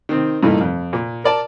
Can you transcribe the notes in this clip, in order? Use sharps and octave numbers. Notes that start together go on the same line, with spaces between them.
D#3 C4
G2 A#2 E3 A3 A#3 D#4
F2
A#2
A#4 D5 A5